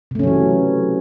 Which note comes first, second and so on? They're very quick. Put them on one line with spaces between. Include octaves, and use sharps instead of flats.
C3 A3 C#4 F#3 E3